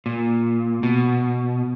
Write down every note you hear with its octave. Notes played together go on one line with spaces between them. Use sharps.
A#2
B2